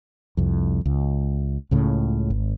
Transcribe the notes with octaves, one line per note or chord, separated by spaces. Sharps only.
C2 F2
C#2
C#2 A2 C#3
G#1